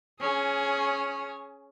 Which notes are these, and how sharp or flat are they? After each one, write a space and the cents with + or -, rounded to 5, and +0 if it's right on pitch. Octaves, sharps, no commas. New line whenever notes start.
C#4 +0 G#4 +20